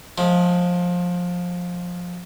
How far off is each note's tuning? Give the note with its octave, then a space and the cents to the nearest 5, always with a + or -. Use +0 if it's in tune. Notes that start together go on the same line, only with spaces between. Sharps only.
F3 +20 G#3 +35